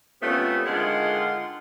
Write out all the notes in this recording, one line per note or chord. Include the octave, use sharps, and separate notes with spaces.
C3 F3 A3 B3 C#4
D3 D#3 G#3 F4 F#5